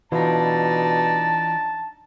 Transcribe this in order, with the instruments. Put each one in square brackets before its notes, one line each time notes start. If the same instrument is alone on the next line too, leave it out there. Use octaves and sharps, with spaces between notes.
[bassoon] B2 [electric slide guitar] E3 F4 [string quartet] D4 D#4 [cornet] A5